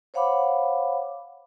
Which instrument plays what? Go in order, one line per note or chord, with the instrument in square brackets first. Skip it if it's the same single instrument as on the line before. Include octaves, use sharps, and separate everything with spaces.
[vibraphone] C5 C#5 F5 F#5 B5 D6